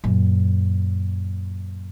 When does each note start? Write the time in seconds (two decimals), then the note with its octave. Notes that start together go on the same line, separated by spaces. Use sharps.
0.04 F#2 A#2